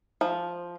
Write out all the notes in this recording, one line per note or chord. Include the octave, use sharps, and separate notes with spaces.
F3